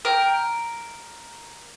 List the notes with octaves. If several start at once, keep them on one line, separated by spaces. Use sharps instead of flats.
A#4 G5